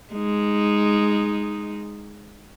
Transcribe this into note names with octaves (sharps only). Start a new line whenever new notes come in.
G#3 D#4